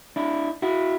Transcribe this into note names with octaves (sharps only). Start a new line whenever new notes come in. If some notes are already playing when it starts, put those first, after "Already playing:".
D4 E4
E4 F#4